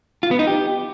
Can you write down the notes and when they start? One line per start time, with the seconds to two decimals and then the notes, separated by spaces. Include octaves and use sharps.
0.23 F4
0.31 B3
0.39 D#4
0.47 G4